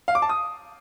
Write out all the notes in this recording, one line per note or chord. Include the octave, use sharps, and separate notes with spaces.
F5
D6
A5
D#6